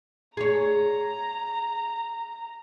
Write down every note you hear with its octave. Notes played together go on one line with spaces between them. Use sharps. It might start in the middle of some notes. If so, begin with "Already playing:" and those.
G#4 C#5 A#5